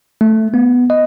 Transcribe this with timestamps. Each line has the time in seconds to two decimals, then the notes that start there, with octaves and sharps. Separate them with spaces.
0.21 A3
0.54 B3
0.90 D#5